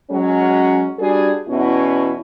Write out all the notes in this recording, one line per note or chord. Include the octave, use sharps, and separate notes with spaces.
F#3 G#3 C#4
G3 D4 F#4 G#4
E2 B2 C#4 E4